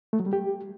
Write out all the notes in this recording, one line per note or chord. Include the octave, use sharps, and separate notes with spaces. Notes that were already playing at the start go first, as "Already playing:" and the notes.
A3
F#3
G3
G4